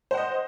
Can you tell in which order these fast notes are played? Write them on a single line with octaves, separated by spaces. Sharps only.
C5 F#5 D#5